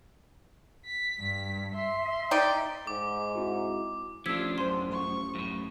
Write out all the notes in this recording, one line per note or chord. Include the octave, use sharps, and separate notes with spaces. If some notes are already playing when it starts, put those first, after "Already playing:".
B6
G2
E5 C6
D#4 D5 G5
G#2 D6
C4 E4 F#4
A1 F3 D4 F4 G4 E6 G#6 B6
F#2 D4 C5 C6
A1 F3 C#6
F#2 A2